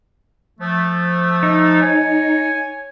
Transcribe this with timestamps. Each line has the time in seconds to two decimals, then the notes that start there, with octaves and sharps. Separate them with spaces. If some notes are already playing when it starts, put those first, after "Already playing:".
0.60 F3 A3
1.43 D#4
1.81 C#5 G#5